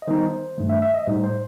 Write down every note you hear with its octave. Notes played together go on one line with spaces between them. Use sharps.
D#5
D#3 G3 B3 D#4 C5
G2 D#3 A3
E5
E5
D#5
A2 G3 D#4 C5
C5